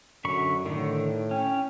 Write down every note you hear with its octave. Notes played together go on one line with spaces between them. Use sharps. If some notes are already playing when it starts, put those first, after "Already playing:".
F#2 D3 B5 C#6
A2 D3 D#3
C#4 G5